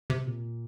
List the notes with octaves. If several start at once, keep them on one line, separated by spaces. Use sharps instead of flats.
C3
A#2